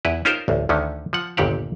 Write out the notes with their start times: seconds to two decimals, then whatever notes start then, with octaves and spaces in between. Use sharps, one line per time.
0.05 E2 E4 B4
0.25 C#4 D#4 F4 G4 A#4 C5
0.48 A1 D2
0.69 D2 D3 D#3 C#4
1.13 F3 F#5
1.37 G1 D#2 A#2 G4 F#5